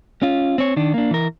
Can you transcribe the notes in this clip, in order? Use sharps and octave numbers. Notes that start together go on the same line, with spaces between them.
C#4 F4
C4 C#5
D#3 D4
A#3 D4
E3 A#4